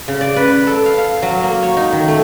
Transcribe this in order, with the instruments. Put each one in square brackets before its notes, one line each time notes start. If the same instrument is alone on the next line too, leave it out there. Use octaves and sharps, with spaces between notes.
[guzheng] C#3
D5
B4
A4
F5
F5
F#3
A#3
C#5
D#4
D#3
A3